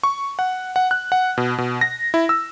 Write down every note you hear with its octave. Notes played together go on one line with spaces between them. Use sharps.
C#6
F#5
F#5
F#6
F#5
B2
B2
A#6
E4
E6